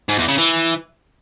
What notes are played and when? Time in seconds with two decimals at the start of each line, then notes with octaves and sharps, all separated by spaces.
0.09 G#2
0.18 E2
0.28 C#3
0.38 E3